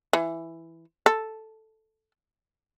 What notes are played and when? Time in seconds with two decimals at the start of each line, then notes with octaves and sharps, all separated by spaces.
0.13 E3
1.06 A4